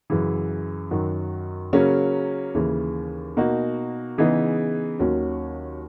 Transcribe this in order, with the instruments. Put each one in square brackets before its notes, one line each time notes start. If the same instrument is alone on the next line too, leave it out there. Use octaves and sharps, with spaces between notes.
[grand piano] F#2 C#3 E3
F#2 D#3 F#3
C#3 F#3 A#3 C#4
D#2 C#3 E3
B2 A#3 D#4 F#4
C#3 E3 B3 D#4 G#4
D#2 D#3 F#3 C#4 F#4